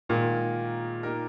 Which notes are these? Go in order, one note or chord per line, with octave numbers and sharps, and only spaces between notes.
A#2 D#3 G#3 D#4 A#4
A#3 D#4 G4 A#4